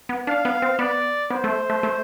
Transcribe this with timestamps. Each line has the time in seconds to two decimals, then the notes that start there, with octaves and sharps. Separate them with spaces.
0.09 B3
0.27 D4 F5
0.45 B3
0.62 C4
0.79 B3 D5
1.31 B3 C5
1.44 A3
1.70 A3
1.83 A3